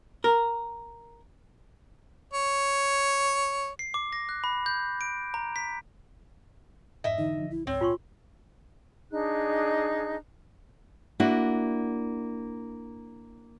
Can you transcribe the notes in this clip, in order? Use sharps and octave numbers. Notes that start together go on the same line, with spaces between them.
A#4
C#5
C7
D6
A#6
F#6
B5
G6
D7
A#5
B6
F2 G#2 D#5 E5
D3 E3 D#4
D3 F3
A#1 E4
C#2 G#2 C4 C#5
A#2 F4 G#5 C6 C#6
D4 D#4 G#4 F#6
A#3 D4 E4 F#4